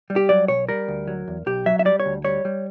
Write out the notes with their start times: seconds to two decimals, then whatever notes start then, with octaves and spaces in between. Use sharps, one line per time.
0.10 G3
0.16 G4
0.29 F#3 D5
0.48 B1 C#5
0.69 G3 A#4
0.88 D2
1.08 F#3
1.28 E2
1.46 B1 G4
1.66 F#3 E5
1.79 E5
1.85 G3 D5
2.00 C#5
2.06 D2
2.24 G3 C#5
2.45 G3